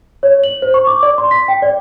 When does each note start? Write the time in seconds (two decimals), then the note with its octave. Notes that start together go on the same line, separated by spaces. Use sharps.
0.23 C#5
0.44 F#7
0.62 C5
0.74 C#6
0.87 D6
1.03 D5
1.18 C6
1.31 B6
1.48 G5
1.62 D5